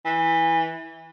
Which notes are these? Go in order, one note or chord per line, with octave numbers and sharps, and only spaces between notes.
E3